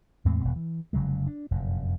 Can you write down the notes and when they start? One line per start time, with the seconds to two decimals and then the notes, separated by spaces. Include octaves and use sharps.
0.25 E2 A2 G#3 C4
0.44 D#1 B2
0.56 E3
0.93 F1 C#3 F#3 G#3
1.27 D4
1.51 F1 F#2 A#2